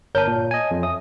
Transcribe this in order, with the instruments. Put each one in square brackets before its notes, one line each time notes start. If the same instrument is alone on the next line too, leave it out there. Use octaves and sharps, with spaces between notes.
[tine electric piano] G1 A#4 G6 [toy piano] C#5 A5
[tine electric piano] A#2
D#5 G#5
F2
[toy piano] E5 [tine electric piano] D#6